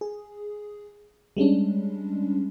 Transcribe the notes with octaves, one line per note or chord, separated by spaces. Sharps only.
G#4
G3 G#3 C#4 D4